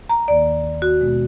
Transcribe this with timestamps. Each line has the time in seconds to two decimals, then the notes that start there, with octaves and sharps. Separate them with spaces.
0.09 A#5
0.28 D#2 D#3 A#3 D5
0.82 F#4
1.00 B2 G#3 B3